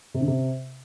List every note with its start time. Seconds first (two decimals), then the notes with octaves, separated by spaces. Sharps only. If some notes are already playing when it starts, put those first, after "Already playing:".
0.14 C3
0.21 D3
0.27 C3